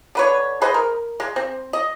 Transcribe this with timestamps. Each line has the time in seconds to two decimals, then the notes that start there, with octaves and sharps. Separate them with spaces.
0.15 D3 B4 C#5
0.62 G#4 B4 C5 D#5
0.74 A#4
1.20 G#3
1.36 C4
1.73 D#5